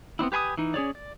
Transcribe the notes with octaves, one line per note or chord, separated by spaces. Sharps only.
B3 C4 D4 E4
G4 B4 G#5 B5 D#6
E3 D#4
C#4 G#4 C#5 D5
D5